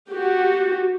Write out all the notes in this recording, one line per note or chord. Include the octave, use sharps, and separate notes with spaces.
F#4 G4